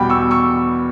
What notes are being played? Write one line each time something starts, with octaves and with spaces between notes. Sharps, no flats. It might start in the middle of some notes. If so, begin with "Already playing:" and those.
Already playing: E2 B2 G3 G5 B5
C#6 E6
C#6 E6